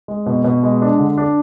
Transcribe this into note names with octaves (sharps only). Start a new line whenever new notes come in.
G#3
B2
B2
G#3
D4
D3
D4